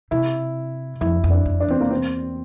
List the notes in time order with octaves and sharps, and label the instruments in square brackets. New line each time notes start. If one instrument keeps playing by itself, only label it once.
[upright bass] C3 [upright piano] E4
[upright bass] F2 [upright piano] E4
[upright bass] F2
[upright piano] D4
[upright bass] F2
[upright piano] D4
[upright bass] E2 [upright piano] C4
[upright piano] A#3
C4